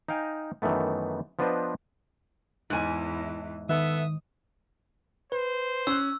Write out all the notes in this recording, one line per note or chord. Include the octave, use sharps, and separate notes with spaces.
D#4 D#5 F5 G5 G#5
F#2 D#3 E3 A3 B3
F3 B3 D4 B4 C5 D#5
E2 G#2 E3 G#5
D#3 B3 A4 E5 D#6
B4 C5
C#4 E6 F#6